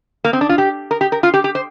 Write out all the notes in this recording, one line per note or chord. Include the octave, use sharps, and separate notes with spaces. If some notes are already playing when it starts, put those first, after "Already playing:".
A#3
C4
D4
F4
G4
A#4
G4
A#4
F4
G4
G4
C5